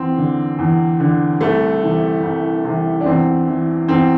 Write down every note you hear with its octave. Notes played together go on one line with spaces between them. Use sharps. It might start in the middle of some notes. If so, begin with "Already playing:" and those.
Already playing: E2 C4
D3
E2
D3
C2 A3
C3 E3
C2
C3 E3
D4
E2 C4
E3
E2 C4